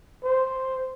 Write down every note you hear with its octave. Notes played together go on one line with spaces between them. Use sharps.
C5